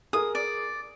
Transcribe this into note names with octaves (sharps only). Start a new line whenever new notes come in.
G#4 A#4 D#6
D5